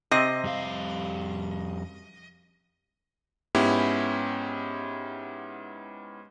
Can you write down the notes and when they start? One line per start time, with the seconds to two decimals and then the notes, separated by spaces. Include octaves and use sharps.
0.11 C3 C4 D#5
0.44 F2 G3 F5
3.55 G#2 B3 C#4 E4 G4